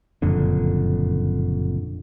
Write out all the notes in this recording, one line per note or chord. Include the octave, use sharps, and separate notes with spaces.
F#1 F2 A#2 D3